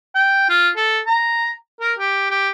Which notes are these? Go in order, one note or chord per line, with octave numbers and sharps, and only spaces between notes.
G5
F4
A4
A#5
A#4
G4
G4